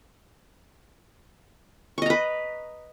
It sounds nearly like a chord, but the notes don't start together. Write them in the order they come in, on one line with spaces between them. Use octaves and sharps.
C#6 D#5 A#5 B4